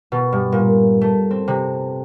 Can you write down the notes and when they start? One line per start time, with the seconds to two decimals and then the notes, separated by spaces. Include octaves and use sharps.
0.12 B2
0.33 G2
0.52 A#2
1.01 A3
1.31 C4
1.48 C3